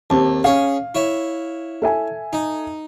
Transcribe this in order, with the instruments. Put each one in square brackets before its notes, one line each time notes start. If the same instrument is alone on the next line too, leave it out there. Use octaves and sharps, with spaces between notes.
[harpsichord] D#2 [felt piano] C4 G4 A5
[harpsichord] C#4 G#4 [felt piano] F5
[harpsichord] E4 C#5
[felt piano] A4 E5 G#5
[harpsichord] D#4